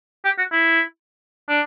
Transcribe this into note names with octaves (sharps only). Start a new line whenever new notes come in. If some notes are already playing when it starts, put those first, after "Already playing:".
G4
F#4
E4
D4